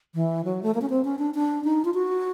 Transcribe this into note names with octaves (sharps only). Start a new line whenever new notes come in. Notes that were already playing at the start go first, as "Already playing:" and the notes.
E3
F#3
A3
A#3
C#4
C4
C#4
D4
D4
D#4
F4
F#4